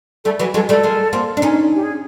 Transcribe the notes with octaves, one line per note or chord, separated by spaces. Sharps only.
G3 A3 A4
E3 F#3 B4
F#3 G#3 A4
G3 A3 A4
G#3 A#3
A#3 C4
D4
C#4 D#4
G4
G#4